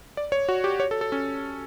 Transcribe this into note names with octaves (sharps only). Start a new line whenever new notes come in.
D5
C#5
F#4
G4
C#5
A4
A4
C#4